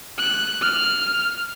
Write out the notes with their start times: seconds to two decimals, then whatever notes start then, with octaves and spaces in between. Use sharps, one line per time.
0.18 F#6
0.61 F6